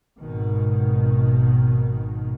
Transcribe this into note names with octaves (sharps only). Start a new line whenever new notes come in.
G#1 B2 D#3